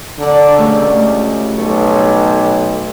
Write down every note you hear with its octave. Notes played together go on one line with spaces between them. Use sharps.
D3 A#4 D5
C#2 F#3 G3 A3
B1 A4 C#5